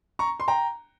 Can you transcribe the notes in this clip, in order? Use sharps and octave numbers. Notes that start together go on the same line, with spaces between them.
A#5 C#6
C6
G5 A#5